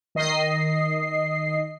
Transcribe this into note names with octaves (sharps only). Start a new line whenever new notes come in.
D#3 D#5 C7